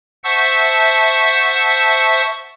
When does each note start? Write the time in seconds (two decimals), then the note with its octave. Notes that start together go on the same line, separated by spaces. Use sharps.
0.24 C5 E5 F#5 A5 C#6 E6